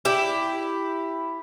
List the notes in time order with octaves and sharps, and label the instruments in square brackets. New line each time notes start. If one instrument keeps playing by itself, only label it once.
[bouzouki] E4 G4